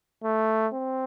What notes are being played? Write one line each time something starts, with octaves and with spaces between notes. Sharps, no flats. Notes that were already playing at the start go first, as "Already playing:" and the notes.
A3
C4